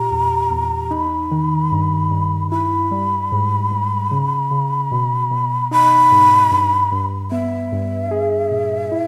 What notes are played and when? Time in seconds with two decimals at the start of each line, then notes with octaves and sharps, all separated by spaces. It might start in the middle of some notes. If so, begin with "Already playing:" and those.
Already playing: A#2 G4 A#5
0.11 E2
0.51 E2
0.91 D#4 B5
1.31 D#3
1.71 G2
2.11 G2
2.51 E4 B5
2.91 G3
3.32 G#2
3.71 G#2
4.11 C#3
4.51 C#3
4.91 B2
5.31 B2
5.71 D#4 B5
6.12 G#2
6.51 G2
6.92 G2
7.31 B3 E5
7.72 G2
8.11 G#4
8.51 A#2
8.91 E4